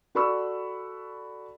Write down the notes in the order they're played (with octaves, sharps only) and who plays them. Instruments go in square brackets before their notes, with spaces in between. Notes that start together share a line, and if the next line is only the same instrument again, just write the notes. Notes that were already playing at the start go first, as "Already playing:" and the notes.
[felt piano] F#4 A4 D5 B5 C#6 E6